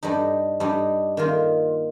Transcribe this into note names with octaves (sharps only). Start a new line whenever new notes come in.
G2 G3 D#4
G2 G3 D#4
D#3 A#3 F4